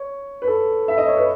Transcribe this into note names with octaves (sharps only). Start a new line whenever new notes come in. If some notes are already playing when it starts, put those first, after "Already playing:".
Already playing: C#5
B4
A4
E5
D#5
C#5
B4